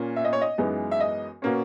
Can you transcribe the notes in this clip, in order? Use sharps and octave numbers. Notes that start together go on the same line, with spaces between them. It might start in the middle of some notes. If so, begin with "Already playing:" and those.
Already playing: A#2 A#3 C#4
E5
D#5
C#5
D#5
F#2 E3 G#3 B3 D#4
E5
D#5
B2 A#3 C#4